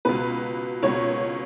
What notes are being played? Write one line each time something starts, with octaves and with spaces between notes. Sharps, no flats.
C#2 B2 B4
C#2 B2 C#5